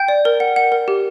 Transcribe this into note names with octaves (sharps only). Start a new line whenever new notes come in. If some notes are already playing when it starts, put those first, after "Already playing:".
Already playing: G5 G6
D5
A#4
F#5
F#5
A#4
G4